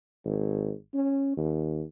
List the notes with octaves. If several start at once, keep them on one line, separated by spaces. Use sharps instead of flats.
G#1
C#4
D#2